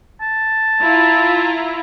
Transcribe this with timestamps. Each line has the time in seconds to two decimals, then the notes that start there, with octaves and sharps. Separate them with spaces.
0.22 A5
0.81 E4 F4 A#5